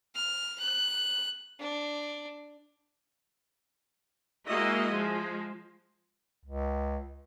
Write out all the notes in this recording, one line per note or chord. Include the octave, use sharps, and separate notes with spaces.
F6
F#6
D4
G#3 A#3 E4 F#4 D#5
F3 G#3
C#2